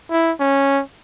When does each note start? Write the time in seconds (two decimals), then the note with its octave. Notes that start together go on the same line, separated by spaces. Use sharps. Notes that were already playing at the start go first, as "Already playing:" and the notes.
0.11 E4
0.40 C#4